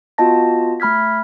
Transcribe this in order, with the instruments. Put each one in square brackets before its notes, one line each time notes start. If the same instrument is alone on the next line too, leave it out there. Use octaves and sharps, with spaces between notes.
[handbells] B3 F4 F#4 D#5 A5 A#6
A3 B5 F6 G#6 B6